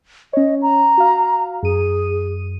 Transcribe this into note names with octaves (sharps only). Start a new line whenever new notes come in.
C#4 C#5 D#5
A#5
F#4 F5
F#2 G#4 D#7